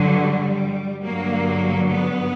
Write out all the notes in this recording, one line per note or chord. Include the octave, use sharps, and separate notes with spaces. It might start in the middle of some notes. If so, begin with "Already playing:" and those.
Already playing: G2 D3 F#3
G3
G2 D3 F#3 A#3
B3